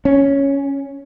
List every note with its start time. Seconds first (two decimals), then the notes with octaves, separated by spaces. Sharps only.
0.05 C#4